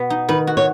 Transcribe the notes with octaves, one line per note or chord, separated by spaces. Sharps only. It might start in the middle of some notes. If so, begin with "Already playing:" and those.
Already playing: B2 B3
D#4
D#3 B4
F#4
C#5